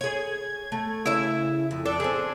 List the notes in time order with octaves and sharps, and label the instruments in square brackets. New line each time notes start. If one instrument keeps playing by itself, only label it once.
[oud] G#4 C#5 [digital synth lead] G#6
[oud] A3
[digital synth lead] C#3 [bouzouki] E4 E5
[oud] F2
[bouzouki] D4 [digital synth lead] A4
[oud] C4 G#4